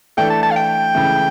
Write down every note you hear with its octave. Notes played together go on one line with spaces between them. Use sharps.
E3 A3 D4 A4 G5
A5
A5
F5
G5
C#2 C#3 E3 A3